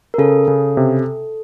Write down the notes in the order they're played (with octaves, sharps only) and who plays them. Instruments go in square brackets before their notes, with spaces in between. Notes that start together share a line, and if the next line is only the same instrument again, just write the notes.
[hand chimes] A#4
[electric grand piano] C#3 [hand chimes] A4
[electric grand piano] C#3
C3